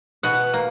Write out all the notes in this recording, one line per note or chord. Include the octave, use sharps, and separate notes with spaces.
B2 F#5
A#3